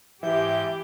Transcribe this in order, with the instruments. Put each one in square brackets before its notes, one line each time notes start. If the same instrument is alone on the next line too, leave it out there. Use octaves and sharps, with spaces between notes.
[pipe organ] G#2 G6 [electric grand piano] E3 [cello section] G4 [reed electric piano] E5